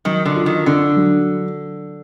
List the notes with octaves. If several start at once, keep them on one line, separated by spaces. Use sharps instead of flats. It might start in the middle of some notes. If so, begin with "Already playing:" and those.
D#3 F#3
D3
F4
D#3
D3 D4
F#3